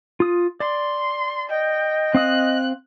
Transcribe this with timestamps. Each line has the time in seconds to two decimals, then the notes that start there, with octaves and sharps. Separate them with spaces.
0.20 F4 D#6
0.60 D5 C6
1.50 D#5 G5
2.15 C4 F5 D#6 F#6